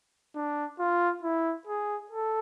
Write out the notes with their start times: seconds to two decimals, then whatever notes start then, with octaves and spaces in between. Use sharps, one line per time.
0.35 D4
0.79 F4
1.23 E4
1.67 G#4
2.11 A4